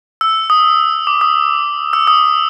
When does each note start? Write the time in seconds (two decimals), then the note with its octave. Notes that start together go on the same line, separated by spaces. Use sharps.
0.21 E6
0.50 D#6
1.07 D6
1.21 D#6
1.93 E6
2.07 D#6